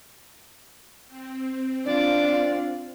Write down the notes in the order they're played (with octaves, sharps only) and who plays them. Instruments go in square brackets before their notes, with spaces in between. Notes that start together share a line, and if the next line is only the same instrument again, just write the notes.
[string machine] C4
[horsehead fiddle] D4 F4 [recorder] D5